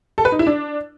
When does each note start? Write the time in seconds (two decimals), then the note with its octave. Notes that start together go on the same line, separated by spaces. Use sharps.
0.18 A4
0.25 B4
0.32 D#4
0.39 E4
0.47 D4